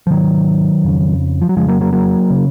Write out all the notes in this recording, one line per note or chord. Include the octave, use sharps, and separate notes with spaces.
F3
G#2 D#3 F#3
F2 C#3
F3
F#3
F2 C#3 F3 G#3
F#3 A#3
F#3 A#3
F#3 A#3
C#3